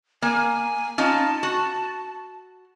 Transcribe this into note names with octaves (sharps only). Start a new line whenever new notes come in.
A#3 G#5
C#4 D#4 F4 A5
F#4